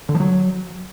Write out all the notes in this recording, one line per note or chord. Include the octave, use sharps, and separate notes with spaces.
D3
F3
F#3